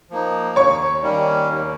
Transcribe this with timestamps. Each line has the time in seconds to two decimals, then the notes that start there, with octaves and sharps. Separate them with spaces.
0.10 F3 A#3 D#4
0.56 D#2 C#5 C#6
1.02 D#3 G3 A#3 C#4
1.48 D#2